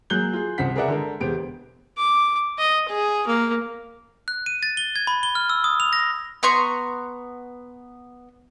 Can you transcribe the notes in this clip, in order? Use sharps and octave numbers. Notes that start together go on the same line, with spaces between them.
F#3 A#3 G#4 F#6 G6 G7
F4 G#4
C2 C#3 C4 F#5 B6
G#4 A#4 B4 D5 E5 F#5
D3 G#3 A4 A#4
E1 B3 G4 C5 D7
D6
D#5
G#4
A#3
F#6
D#7
A6
G7
G#6
B5
G7
F6
E6
D#6
F7
A#6
B3 A#5 C6 C#6